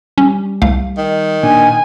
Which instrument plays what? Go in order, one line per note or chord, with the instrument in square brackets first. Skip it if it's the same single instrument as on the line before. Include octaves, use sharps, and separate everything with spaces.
[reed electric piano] G3 [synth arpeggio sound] C#4
[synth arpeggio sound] C2 A3 F5
[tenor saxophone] D#3
[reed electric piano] A#2 D4 [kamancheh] G#5